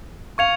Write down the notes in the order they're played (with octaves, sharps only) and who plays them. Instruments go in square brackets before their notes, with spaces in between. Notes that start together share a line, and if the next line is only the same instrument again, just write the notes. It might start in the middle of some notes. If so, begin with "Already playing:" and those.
[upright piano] F5 [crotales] C#6 G#6 C#7 F7